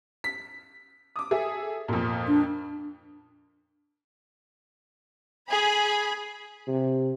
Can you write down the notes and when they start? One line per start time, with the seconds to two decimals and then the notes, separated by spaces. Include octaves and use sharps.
0.24 B6
1.16 D6 D#6
1.31 G#4 A4 E5
1.88 F2 A#2
2.28 D4
5.50 G#4 B5
6.68 C3